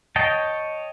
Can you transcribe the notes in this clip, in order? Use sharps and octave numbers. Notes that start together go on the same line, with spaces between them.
C#5 D#5 G5 A5